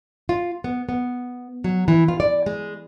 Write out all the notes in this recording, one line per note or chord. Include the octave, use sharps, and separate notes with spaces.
F4
B3
B3
F#3
E3
F4
D5
G#3